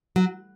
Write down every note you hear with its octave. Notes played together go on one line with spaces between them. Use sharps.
F#3